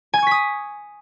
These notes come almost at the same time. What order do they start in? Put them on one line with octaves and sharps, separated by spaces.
G#5 G#6 C#6 B6 D#6